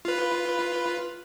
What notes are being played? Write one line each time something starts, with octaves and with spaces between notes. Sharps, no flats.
F4 B4